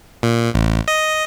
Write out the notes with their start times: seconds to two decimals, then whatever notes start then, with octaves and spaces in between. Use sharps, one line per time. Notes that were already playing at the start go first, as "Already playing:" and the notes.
0.23 A#2
0.54 A1
0.88 D#5